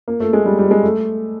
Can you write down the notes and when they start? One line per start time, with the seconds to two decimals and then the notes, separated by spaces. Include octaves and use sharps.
0.08 A#3
0.20 A3
0.33 G#3
0.46 G3
0.59 G3
0.71 G#3
0.83 A3